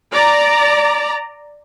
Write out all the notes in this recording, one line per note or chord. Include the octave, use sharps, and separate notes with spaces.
D5 A#5